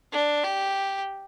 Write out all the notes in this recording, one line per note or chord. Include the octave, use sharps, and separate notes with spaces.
D4
G4